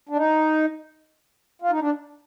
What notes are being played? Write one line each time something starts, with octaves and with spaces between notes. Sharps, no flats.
D4
D#4
F4
D#4
D4